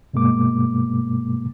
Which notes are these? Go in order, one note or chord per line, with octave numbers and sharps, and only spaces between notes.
G2 B2 G#3 A#3 D6